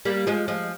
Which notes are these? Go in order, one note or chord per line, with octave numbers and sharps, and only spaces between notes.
G3 A#3
F3 G#3
F3 G#3